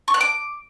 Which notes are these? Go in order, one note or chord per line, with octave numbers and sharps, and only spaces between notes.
C#6
F#6
D6